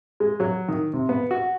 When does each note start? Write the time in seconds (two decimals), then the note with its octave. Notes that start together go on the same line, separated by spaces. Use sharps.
0.20 G#3
0.40 F#3
0.68 D#3
0.94 C3
1.09 B3
1.31 F#4